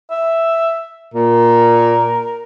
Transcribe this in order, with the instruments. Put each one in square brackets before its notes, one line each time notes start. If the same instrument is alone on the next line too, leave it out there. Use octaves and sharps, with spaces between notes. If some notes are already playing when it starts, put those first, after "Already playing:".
[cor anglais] E5
[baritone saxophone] A#2 [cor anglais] A#4